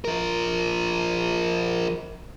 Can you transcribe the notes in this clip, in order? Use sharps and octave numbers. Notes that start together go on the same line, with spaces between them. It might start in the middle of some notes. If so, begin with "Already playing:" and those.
F3 A#4